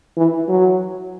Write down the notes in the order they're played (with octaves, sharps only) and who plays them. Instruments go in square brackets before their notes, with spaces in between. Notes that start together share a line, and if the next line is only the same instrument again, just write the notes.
[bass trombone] E3
F#3